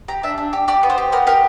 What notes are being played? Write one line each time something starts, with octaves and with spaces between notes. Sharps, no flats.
G4 A#5
D4 E5
D4
G4
G4 D5
B3
C5
G4
B3 A#4
G4 A#4